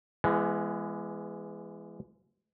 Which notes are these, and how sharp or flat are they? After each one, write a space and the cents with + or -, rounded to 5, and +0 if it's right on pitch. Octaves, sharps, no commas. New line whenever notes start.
E3 +30 G#3 +0 B3 -20